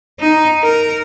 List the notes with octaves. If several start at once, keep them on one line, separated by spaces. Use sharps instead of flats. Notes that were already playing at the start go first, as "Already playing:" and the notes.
D#4
A#4